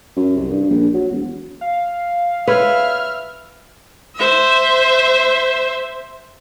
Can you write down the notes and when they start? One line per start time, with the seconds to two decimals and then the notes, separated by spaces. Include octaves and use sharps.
0.16 F#2
0.36 C2
0.50 G2
0.69 A#1
0.94 F#3
1.11 E1
1.61 F5
2.47 B4 C#5 E5 F6
4.16 C5 E5